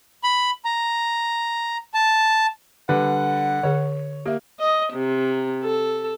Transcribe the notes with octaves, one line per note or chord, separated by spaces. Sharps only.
B5
A#5
A5
D3 G3 B4 F#5
D3 G#4 C#5
A#3 G4 E5
D#5
C3
A4